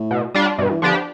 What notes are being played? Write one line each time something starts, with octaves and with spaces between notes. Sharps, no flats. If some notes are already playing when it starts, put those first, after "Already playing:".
Already playing: A2
B2
G3 D4 F4
G2 B2
E3
D3 F3 B3 D4 G4